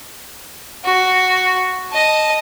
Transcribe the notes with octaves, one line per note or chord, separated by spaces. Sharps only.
F#4
D#5 A5